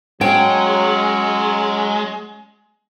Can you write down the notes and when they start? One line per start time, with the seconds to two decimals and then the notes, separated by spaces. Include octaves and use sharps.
0.21 F#3 G#3 C#4 G5